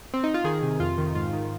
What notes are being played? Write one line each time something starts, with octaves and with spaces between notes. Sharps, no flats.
C4
D#4
F4
D#3 G#4
C3
F2 F4
D#3
G#2 F4
D#3